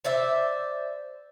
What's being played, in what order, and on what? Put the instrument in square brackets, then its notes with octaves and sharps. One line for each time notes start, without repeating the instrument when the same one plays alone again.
[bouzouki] C5 D5 E5